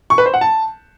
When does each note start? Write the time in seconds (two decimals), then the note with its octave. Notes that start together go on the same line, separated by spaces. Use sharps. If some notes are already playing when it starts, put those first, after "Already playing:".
0.10 C#6
0.18 B4
0.26 C5
0.34 F#5
0.41 A5